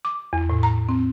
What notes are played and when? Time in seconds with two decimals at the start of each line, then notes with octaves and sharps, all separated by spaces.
0.05 D6
0.33 E2
0.50 A2
0.63 A#5
0.89 C4